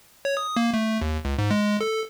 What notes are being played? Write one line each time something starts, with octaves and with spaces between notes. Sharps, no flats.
C#5
D#6
A#3
A3
D#2
C#2
G#2
G#3
A4